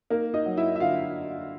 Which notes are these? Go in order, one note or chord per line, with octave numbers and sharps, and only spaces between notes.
A#3 D#4 A#4
D#4 D#5
F#3
E4 E5
E5
D3 F4 F5